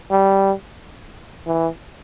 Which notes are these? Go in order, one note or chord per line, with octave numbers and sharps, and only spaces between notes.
G3
E3